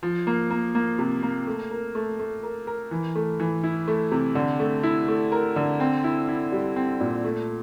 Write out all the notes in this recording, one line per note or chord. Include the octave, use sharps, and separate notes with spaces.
F3
A#3
A#3
A#3
C3
A#3
A3
A#4
A3
A3
A#4
A#4
E3
A3
E3
E4
A3
C3
D3
A3
E4
A3
A#4
D3
C4
E4
E4
G3
C4
A#2
A3